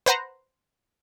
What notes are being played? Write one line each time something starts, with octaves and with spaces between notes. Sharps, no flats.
B4 C5 F#5 A#5